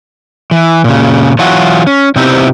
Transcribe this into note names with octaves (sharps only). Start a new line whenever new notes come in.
E3
A#2 C#3
E3 F#3 F4 F#4
C#4
C3 B3 C4 D#4 E4 G4